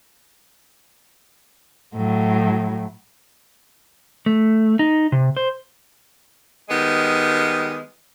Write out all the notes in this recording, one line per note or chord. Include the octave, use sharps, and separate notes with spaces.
A2 F#3
A3
D#4
C3
C5
D#3 G3 G#3 B3